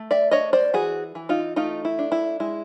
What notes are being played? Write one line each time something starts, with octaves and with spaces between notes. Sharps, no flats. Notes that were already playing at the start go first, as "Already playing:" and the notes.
Already playing: A3
D5 E5
D4 C#5 D#5
C5 D5
E3 F#4 G#4
E3
D#4 F4
A3 D#4 F4
E4
D4
E4
G#3 E4